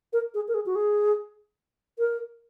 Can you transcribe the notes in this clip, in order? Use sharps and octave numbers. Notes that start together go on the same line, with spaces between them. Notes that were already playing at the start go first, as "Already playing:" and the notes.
A#4
G#4
A#4
G#4
F#4
G#4
A#4